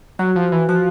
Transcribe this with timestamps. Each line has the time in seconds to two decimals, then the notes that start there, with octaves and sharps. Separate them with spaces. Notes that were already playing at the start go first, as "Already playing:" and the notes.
0.19 F#3 F#4
0.36 F3
0.52 E3
0.69 F3 F#4